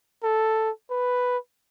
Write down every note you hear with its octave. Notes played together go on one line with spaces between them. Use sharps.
A4
B4